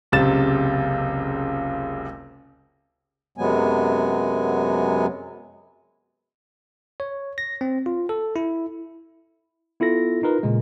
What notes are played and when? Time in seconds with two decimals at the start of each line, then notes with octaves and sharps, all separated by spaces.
0.12 F#1 C#2 C3 A6 E7
3.38 F#2 C3 F#3 G#3 B3 G#5
7.00 C#5
7.38 A#6
7.61 C4
7.86 F4
8.09 A4
8.36 E4
9.80 B3 E4 F4 A4 A#6
10.23 D#4 F4 A#4 B4
10.43 A#2 C#3 G#3